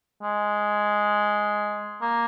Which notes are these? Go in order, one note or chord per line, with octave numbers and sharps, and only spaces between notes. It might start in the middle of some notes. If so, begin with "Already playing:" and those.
G#3
A#3